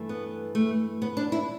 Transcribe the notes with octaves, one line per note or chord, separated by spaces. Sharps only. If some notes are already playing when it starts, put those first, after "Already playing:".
Already playing: G2 E3 A3
B3
A3
B3
D4
E4